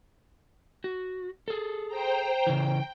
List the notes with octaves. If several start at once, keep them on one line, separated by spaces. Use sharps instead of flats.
F#4
G#4 A4
C5 G5 A#5
C#3 E3 G5